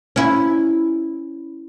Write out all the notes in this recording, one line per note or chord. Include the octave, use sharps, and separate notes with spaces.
C#4 E4